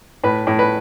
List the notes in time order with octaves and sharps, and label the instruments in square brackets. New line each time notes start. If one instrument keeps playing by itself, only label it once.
[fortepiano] A2 B4
A2
B4